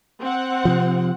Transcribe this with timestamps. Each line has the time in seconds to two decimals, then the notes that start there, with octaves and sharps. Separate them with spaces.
0.20 C4 F#5
0.65 C3 F3